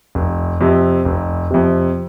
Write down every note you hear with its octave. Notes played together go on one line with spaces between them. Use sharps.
F1
F2 C3
F1
F2 C3